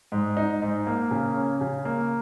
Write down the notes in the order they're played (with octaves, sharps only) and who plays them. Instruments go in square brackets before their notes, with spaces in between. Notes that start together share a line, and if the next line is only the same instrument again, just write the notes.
[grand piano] G#2
D#4
G#2
A#3
C#3
C#4
C#3
A#3